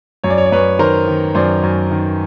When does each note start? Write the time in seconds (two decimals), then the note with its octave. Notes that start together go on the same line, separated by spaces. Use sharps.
0.24 F#2 C#5
0.30 D5
0.38 C#5
0.46 D5
0.52 F#2 B4 C#5
0.79 D#3 A#4 C5
1.07 D#3
1.35 F#2 C5 D5
1.63 F#2
1.91 D#3